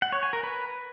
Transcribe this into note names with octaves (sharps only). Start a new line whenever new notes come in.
F#5
C#5
G#5
A#4
B4